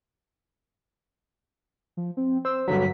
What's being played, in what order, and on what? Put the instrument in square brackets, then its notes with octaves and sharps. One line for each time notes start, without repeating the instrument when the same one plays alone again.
[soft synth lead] F3
C4
[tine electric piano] C5 [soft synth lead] E6
[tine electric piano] G2 D3 F#3 [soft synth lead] B6